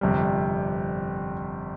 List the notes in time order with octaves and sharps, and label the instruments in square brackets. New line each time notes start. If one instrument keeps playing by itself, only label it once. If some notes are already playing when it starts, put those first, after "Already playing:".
[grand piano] G1 F2 C3 G3